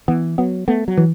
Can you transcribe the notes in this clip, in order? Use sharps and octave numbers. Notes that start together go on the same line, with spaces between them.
E3 B3
F#3 B3
A3 B3
F#3
E3